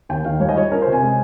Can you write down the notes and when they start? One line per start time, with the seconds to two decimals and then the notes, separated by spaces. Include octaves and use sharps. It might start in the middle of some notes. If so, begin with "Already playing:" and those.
0.09 D#2 G5
0.25 D#3 F5
0.40 G3 C#5
0.49 D#5
0.56 F4 C#5
0.72 C#4 A#4
0.82 C5
0.87 C3
0.93 G#5
1.02 G#3